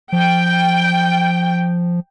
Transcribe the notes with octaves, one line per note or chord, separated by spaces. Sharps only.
F3 G5